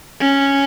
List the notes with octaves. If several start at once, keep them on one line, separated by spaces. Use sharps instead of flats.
C#4